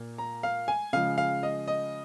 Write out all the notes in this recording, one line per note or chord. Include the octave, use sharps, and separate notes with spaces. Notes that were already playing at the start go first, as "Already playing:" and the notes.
Already playing: A#2 A#3
A#5
F5
G#5
C#3 F3 G#3 F5
F5
D#5
D#5